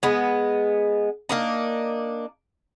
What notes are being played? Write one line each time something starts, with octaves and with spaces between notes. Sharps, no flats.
G#3 B3
A#3 D4 D#4